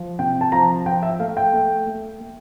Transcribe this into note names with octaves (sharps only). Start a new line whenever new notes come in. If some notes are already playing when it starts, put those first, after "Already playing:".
Already playing: F3
C3 G5
A5
F3 A#5
F3 G5
E5
A3 F5
G5
A3
A3
A3